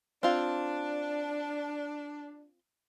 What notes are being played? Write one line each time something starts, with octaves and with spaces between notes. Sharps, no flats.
C4 D4 F4